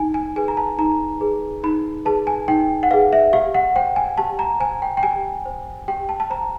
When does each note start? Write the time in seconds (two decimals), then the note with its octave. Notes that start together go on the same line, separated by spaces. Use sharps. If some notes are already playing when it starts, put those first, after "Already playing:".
Already playing: D#4 G#5
0.14 G#5
0.36 G#4 B4 G#5
0.48 A#5
0.57 A5
0.78 D#4 A#5
1.21 G#4 B4
1.63 D#4 B5
2.05 G#4 B4 A5
2.27 G#5
2.48 D#4 G5
2.83 F#5
2.91 G#4 B4 F5
3.13 E5
3.33 G4 F5
3.54 F#5
3.76 C5 G5
3.96 G#5
4.18 G4 A5
4.39 A#5
4.60 C5 G#5
4.82 G5
4.97 G5
5.03 G4 G#5
5.45 C5
5.88 G4 G5
6.09 A5
6.20 A5
6.30 C5 A#5